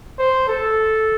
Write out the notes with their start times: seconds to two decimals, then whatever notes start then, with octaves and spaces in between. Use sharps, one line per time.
0.19 C5
0.48 A4